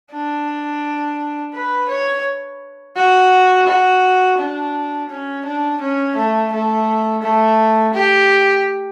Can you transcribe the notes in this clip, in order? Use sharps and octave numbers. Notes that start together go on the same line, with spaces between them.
D4
B4
C#5
F#4
F#4
D4
C#4
D4
C#4
A3
A3
A3
G4